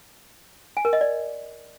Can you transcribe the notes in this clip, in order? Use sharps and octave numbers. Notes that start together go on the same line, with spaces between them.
G#5
A#4
D#5
D5